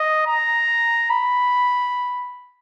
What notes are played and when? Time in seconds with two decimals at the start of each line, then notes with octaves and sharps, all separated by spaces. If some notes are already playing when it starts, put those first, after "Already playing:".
Already playing: D#5
0.27 A#5
1.10 B5